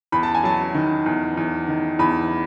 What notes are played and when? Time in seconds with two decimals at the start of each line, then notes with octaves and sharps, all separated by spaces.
0.12 E2 B5
0.23 A5
0.35 G#5
0.43 F#3 A5
0.74 D#3
1.06 E2
1.37 E2
1.68 D#3
1.99 E2 B5